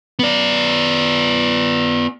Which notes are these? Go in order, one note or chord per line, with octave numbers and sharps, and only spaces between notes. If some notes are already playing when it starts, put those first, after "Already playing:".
B3 D5